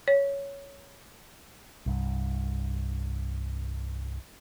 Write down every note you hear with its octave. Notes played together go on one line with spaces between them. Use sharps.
C#5
C2 G2